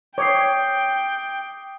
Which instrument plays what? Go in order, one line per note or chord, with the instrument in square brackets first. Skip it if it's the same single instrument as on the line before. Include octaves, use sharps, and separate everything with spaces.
[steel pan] C#5 [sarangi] G5 [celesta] D6 D#6 C7